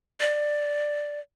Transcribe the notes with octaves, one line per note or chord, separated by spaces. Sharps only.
D5